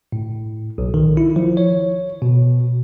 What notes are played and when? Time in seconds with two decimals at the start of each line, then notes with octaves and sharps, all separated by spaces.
0.12 A2
0.78 B1
0.94 D#3
1.17 E4
1.36 F3
1.57 C#5
2.22 B2